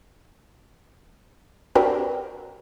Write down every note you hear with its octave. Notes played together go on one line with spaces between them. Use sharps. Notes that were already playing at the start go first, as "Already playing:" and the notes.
C4 D4 F#4 G4 A#4 B4